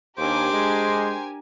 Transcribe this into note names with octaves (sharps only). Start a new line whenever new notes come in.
D#2 D4 G4 A#4 C5 G#5 D6
G#3